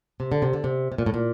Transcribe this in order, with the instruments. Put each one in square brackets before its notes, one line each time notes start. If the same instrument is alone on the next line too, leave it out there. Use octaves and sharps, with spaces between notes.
[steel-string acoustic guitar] C3
D3
C3
D3
C3
C3
A#2
A2
A#2